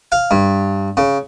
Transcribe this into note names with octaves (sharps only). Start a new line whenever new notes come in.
F5
G2
C#3